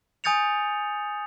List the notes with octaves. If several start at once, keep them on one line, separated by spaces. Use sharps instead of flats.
G#5 D#6 G6 A6 C#7 F7